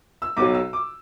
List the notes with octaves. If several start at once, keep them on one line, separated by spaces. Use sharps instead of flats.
E6
B1 B2 F#3 D6
E6
D6